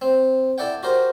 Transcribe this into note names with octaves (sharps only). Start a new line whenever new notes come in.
C4
E4 A4 D5 F#5 G5
F#4 G4 A#4 C5